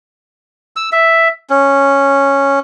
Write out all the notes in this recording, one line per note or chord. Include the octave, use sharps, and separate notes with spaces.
E6
E5
C#4